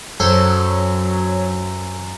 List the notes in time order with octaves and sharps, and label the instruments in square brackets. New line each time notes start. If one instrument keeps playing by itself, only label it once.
[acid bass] F#2 [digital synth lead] F#3 [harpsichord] A4 C5